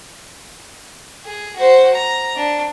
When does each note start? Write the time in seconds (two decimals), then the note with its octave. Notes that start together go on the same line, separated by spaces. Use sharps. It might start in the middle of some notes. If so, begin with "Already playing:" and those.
1.25 G#4
1.56 F#4 C5
1.94 A#5
2.36 D4